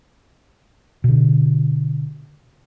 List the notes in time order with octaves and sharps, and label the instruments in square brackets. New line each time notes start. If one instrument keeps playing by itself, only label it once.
[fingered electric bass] B2 D3